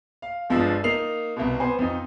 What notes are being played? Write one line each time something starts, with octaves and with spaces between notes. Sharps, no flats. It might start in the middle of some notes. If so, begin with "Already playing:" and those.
F5
G1 F3 G#3 D4 E6
A#3 D#4 C7 F7
C2 B2
B3 C5 G#5
F2 D#4